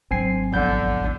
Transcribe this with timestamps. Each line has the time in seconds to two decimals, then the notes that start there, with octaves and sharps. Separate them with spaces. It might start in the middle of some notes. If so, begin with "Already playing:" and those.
0.11 G#1 F#3 C4 D4 G#5 C7
0.52 A#1 E2 D3 G6